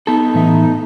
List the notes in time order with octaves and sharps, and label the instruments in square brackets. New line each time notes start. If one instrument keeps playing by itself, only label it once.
[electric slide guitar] B3 A4 [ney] D#4
[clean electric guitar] A2 E3 E5